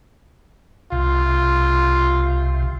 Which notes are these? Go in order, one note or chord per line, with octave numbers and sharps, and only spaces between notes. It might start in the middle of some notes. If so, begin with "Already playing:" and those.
C2 C3 F4